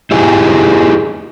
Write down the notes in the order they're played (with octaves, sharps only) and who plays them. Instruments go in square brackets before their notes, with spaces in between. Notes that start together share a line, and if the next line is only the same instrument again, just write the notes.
[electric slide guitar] D#4 E4 G4 G#4